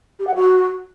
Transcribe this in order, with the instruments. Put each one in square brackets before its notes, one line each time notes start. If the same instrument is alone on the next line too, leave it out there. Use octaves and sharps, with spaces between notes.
[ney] G4
F#5
F#4